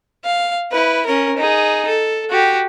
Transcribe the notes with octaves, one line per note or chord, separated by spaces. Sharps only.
F5
E4 B4
C#4 A#4
D#4 G#4
A4
F#4 G4